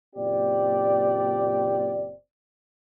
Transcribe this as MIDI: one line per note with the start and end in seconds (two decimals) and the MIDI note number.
0.16 2.13 30
0.16 2.13 46
0.16 2.13 60
0.16 2.13 67
0.16 2.13 74